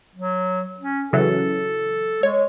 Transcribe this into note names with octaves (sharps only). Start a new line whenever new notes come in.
F#3
C#4
C#3 E3 F#3 A4
G#3 C#5